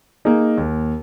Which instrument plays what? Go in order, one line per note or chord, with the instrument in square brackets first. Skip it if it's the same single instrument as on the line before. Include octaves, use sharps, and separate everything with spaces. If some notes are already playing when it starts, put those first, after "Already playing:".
[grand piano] A#3 D#4 G#4
D#2